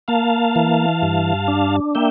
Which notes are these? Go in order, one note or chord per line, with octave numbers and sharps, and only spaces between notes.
A#3 F5 A5
E3
G2
D4
A#3 E5 G5